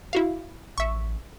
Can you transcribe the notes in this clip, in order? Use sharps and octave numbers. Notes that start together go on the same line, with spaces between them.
E4 F#4 F5
A1 E5 C#6